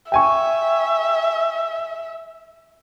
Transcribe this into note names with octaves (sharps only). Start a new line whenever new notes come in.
E5 G5 G#5 C#6